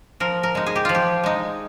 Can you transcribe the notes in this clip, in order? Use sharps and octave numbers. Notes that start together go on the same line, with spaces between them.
F3 A#4
A#4
G#3 D#4
G#4
G4
F3 F4
G4
G#3 D#4